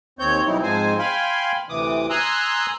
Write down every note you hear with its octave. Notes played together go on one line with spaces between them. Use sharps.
D#2 C4 C#5 G6
B2 F#3 G3 C4 D#4 E4
G#2 F3 G#3 C4 C5 G#5
F5 G5 G#5 B5 C6
D2 C3 E3 D6 D#6
G#5 A#5 C6 D#6 E6 F#6